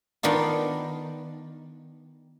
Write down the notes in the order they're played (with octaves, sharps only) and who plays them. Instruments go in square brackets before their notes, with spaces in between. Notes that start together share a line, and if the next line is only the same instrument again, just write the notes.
[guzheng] D#3 B3 D4 F4